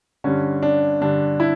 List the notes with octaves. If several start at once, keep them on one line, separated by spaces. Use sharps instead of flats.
G2 D3 C#4
D4
G2 D3 D4
E4